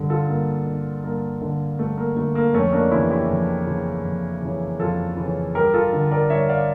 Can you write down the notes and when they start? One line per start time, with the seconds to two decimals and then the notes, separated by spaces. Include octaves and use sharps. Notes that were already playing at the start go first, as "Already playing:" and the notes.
Already playing: G2 D3
0.10 F4 A4
0.28 G2 A#3
0.66 D3
1.03 G2 A#3
1.41 D3
1.79 G2 A3
1.98 A#3
2.17 D3 A3
2.35 A#3
2.54 F2 A3 C#4
2.73 A#3 D4
2.91 C#3 E3 C#4 E4
3.10 E4 G4
3.29 F2
3.66 C#3 E3
4.05 F2
4.42 C#3 E3
4.79 F2 F4 A4
5.17 C#3 E3
5.55 G2 G4 A#4
5.74 F4 A4
5.93 D3
6.11 A#4 D5
6.30 G2 C#5 E5
6.49 D5 F5